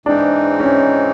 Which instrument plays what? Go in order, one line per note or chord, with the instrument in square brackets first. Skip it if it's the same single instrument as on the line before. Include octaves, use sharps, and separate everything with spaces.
[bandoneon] G#2 E3 G#3 C4 D#4 [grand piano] D4
[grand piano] C#4